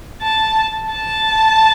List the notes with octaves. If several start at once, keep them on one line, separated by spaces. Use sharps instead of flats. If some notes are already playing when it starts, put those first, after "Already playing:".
A5
A5